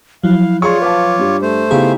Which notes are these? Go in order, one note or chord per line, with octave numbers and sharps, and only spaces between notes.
F3 F#3 E4 F5
F4 G#4 C#5 D5 C6 C#6
B4 F5 A5 D6
G2 G3
A3 C5
C#3 B3 D#4 E4 G4 G#4 F5